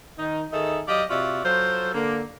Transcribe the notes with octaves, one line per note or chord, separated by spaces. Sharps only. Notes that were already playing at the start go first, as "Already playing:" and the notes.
D#3 D#4
D#3 D#4 G#4 A4 E5
F#3 G4 D5 D#5 F5
C3 F4 F#4 D5 E5
F#3 F4 A4 C5
D3 A#3